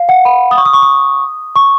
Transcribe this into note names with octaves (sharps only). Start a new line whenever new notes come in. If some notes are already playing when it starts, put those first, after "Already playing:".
Already playing: F5
F#5
B5
D#6
C#6
D#6
C#6
D#6
C#6